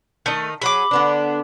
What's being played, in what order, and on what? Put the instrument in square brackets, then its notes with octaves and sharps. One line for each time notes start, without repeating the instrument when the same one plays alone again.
[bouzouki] D#3 D#4 [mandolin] A3
[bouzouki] F#3 G#4 [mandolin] B5 D6
[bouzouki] D3 B3 D4